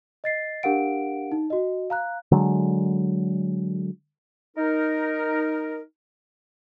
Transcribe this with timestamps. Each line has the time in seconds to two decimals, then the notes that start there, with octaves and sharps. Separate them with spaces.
0.24 D#5 A6 C7
0.63 D4 G4 A#4 F5 F#5 D7
1.32 D#4
1.50 F#4 D#5
1.90 F5 A#5 F#6
2.32 D3 F#3 G#3
4.57 D#4 A#4